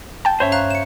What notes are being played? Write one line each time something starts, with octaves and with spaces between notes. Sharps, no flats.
G5 A5
G2 C#4 C5 C#5 E5
F5 A#5 F#6
C#7 E7